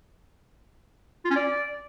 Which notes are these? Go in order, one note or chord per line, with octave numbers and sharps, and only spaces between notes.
F4
C#4
D5